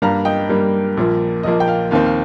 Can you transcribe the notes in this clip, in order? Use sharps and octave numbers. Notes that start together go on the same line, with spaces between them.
G2 G3 A#3 F5 A#5
D#5 G5
G2 G3 A#3
A#1 A#2 F3 A#3
A#1 A#2 F3 A#3 D#5
G5
F5
D#2 D#3 C4 F5
F5